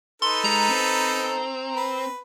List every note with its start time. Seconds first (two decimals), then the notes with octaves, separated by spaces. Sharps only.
0.22 D#4 A4 B4 C6
0.44 G#3 A#5
0.70 C4
1.76 B4